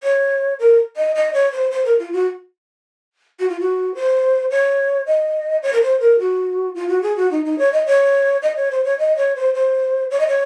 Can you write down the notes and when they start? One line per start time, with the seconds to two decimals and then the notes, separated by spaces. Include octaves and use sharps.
0.03 C#5
0.59 A#4
0.96 D#5
1.15 D#5
1.33 C#5
1.52 C5
1.71 C5
1.85 A#4
1.99 F4
2.13 F#4
3.40 F#4
3.49 F4
3.60 F#4
3.95 C5
4.51 C#5
5.06 D#5
5.63 C#5
5.73 A#4
5.82 C5
6.00 A#4
6.19 F#4
6.75 F4
6.88 F#4
7.02 G#4
7.17 F#4
7.31 D#4
7.45 D#4
7.59 C#5
7.73 D#5
7.86 C#5
8.42 D#5
8.56 C#5
8.71 C5
8.85 C#5
8.98 D#5
9.17 C#5
9.36 C5
9.54 C5
10.11 C#5
10.19 D#5
10.27 C#5